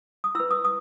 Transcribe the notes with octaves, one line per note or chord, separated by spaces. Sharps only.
D#6
E4 B4 E6
D#6
D#6